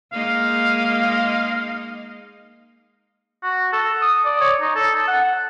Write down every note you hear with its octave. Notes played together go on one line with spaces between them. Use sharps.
G#3 A#3 D#4 F5
F#4
A4
D#6
D5
C#5
D#4
A4
A5
F#5